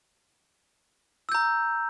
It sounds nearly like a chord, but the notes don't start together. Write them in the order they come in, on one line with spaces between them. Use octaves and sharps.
E6 G6 A#5